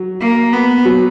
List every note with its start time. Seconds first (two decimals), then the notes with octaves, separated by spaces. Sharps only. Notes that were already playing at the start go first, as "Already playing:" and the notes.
Already playing: F#3
0.21 A#3
0.53 B3
0.85 F#3